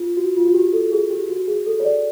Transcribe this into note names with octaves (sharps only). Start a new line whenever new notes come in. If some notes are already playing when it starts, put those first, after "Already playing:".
Already playing: F4
F#4
F4
F#4
G4
A4
G#4
G4
F#4
G#4
A4
C#5
D5